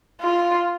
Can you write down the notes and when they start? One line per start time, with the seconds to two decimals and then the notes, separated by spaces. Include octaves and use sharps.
0.21 F4